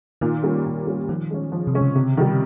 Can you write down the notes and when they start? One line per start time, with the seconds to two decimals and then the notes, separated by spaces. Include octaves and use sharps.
0.21 A#2 D#3
0.43 G3 A#3 C#4
0.65 A#2
0.87 G3 A#3 C#4
1.09 D#3 F3
1.30 G#3 C#4
1.52 F3
1.67 C3
1.74 G#3 C#4
1.81 C#3
1.96 C3
2.17 D#3 G3